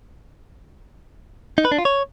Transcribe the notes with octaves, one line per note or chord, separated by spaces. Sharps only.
D#4
B4
D4
F4
C#5